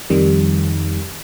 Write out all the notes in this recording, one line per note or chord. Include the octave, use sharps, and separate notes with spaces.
F2 D#3 G3